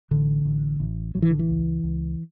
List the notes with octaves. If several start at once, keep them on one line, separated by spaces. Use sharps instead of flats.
A1 D3
A1
A1
A1 F#3
E3
D3
E3
C#2
C#2